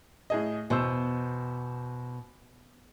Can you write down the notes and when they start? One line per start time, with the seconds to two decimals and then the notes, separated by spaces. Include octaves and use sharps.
0.30 A2 G#4 D#5
0.70 E2 B2 C5 E6